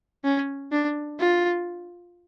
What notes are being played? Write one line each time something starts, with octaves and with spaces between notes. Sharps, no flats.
C#4
D4
F4